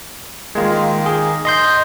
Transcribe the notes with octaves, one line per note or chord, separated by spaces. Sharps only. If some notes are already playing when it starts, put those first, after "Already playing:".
D#3 G#3 A#3 F4
G#4
D#5 C6 G6